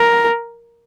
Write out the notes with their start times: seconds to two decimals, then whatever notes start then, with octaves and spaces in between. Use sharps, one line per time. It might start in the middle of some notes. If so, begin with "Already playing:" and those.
Already playing: A#4